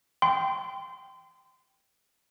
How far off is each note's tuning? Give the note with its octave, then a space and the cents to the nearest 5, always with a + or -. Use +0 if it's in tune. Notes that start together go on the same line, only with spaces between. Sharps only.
G5 +0 C6 -25